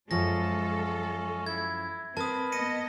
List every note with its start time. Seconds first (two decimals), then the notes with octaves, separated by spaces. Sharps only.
0.11 F#2 F3 G#3 C#4 A4 A5 A#6
1.46 E4 G#6
2.17 C4 A#4 B4 A5 D#6
2.52 B3 D#5 A#6 C#7 D#7